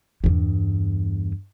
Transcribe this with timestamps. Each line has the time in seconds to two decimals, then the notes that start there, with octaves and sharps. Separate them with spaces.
0.24 E2 G2